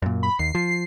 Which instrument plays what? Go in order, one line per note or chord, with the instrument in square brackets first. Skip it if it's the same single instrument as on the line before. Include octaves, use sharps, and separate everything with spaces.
[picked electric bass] F#2 A#2
[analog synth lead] B5
[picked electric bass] D#2 [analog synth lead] C7
[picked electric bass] F3